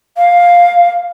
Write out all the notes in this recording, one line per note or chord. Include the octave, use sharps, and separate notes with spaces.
F5